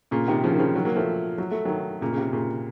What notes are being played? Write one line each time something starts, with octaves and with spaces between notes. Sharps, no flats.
A#2 C#3
C3 D#3
C#3 F3
D#3
C#3 F3
D#3 F#3
F#3 A#3
F3 A3
F#3
A3
D#3 F#3
A#2 C#3
C#3
C3
A#2 C#3